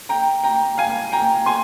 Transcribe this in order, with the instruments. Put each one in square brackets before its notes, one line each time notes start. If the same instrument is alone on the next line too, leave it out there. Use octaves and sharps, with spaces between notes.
[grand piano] G5 A#5
G5 A#5
F5 G#5
G5 A#5
G#5 C6